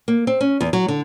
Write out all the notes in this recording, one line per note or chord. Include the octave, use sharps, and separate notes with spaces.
A#3
C4
C#4
E2
F#3
D3